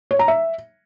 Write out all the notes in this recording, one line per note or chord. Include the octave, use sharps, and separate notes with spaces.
C#5
A#5
E5